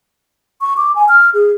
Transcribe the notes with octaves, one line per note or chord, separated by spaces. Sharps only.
C#6
D6
G#5
F6
G#4